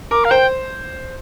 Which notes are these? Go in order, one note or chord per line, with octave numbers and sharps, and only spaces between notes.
A#4 D6
F5
C5 G5